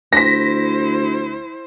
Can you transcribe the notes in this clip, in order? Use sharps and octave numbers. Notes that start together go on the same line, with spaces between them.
D2 E4 C5 A#6 B6